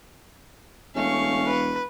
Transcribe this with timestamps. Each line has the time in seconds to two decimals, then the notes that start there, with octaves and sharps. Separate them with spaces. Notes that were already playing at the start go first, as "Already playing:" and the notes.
0.95 E1 A3 C#4 F5 C#6
1.47 B4